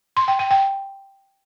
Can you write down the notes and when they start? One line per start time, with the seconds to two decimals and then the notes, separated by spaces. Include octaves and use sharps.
0.17 C6
0.28 G5
0.39 G5
0.51 G5